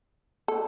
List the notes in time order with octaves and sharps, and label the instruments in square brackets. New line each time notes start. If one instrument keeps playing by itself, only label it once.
[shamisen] A4